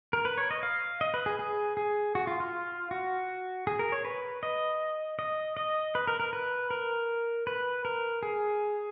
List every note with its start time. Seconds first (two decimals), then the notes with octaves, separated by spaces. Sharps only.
0.13 A#4
0.25 B4
0.38 C#5
0.51 D#5
0.63 F5
1.01 D#5
1.14 B4
1.26 G#4
1.39 G#4
1.77 G#4
2.15 F#4
2.27 F4
2.40 F4
2.91 F#4
3.67 G#4
3.79 A#4
3.92 C#5
4.05 B4
4.43 D#5
5.19 D#5
5.57 D#5
5.95 B4
6.08 A#4
6.20 A#4
6.33 B4
6.71 A#4
7.47 B4
7.85 A#4
8.23 G#4